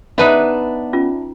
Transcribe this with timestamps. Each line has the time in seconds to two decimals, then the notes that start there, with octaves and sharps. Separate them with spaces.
0.18 B3 D4 D#4 B4 D5 E5 B5
0.93 C#4 F4